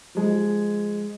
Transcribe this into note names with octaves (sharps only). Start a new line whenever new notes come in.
F3 G#3